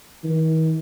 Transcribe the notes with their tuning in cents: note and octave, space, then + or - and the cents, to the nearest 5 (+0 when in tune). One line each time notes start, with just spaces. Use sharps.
D#3 +45